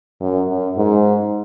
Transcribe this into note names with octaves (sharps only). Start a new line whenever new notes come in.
F#2
F#2
G#2